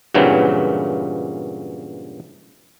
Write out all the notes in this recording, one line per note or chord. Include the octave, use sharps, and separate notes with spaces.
G2 A#2 C#3 E3 F#3 C4